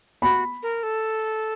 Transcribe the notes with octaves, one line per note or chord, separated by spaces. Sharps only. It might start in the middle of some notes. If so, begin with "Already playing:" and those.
F#4 B5
A#4
A4